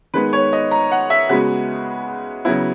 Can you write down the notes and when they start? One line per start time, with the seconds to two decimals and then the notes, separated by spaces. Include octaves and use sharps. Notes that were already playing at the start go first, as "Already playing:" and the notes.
0.14 D#3 G#3 B3 B4
0.33 C#5
0.53 D#5
0.71 A#5
0.92 F#5
1.10 E5
1.29 C#3 G#3 B3 F#4
2.45 C#3 F#3 B3 E4